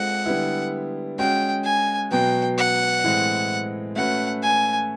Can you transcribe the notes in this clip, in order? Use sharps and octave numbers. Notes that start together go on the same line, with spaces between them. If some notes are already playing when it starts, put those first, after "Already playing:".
Already playing: G#3 C4 F4 A4 F#5
D3 G3 B3 E4
G#3 C#4 F#4 G5
G#5
B2 F#3 B3 G5
F#5
A2 E3 G#3 C4
A3 C#4 F#4 B4 F#5
G#5